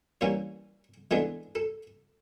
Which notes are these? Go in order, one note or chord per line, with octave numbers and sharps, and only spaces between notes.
E3 G3 A#3 C#4 C#5
E3 G#3 B3 D4 A4
A4